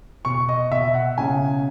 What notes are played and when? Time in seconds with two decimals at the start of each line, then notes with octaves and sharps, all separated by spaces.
0.25 B2 C#6
0.49 D#5
0.71 B2 E5
0.94 F#5
1.18 C#3 G#5